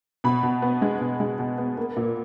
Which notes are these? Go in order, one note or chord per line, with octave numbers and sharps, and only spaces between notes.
B2 B5
B2
B3
G#3
B2
G#3
B2
B3
A#3
A#2